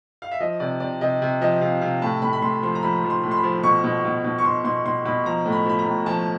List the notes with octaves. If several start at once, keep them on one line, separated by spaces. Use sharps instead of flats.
F5
E5
F3 D#5
C3 D5
C3 D5
C3 D#5
C3
F3 D#5
C3 F5
C3 F5
A2 A5
A2 B5
B5
A2 C6
F3 C6
A#5
F3 B5
F3
C6
A2
C6
B5
F3
B2 C#6
B2
B2
B2
C#6
B2 C6
B2 C6
B2 C6
B2 B5
F3 A#5
A2
B5
F3 B5
A#5
A2
F3 A5